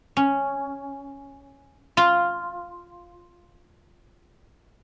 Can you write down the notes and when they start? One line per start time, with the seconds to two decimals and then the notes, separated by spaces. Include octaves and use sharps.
0.17 C#4
1.97 F4